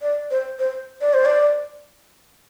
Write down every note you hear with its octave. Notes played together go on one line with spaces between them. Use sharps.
D5
C5
C5
D5
C5
D5